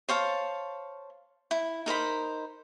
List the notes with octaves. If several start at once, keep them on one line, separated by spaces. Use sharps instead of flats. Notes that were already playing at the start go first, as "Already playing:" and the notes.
C5 C#5 F5 A5
E4
D#4 A#4 C5 B5